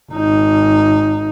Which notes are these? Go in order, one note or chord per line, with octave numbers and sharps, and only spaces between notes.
G#1 D#4